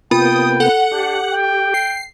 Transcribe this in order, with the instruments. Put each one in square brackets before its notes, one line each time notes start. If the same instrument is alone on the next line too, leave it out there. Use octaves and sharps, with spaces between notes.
[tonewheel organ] C3 A#3 B3 [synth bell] F4 B5 [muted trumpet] G5 [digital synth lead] D#6
[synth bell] A4 [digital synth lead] F#5
[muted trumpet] D4 [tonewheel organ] G4
[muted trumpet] G5
[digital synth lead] C7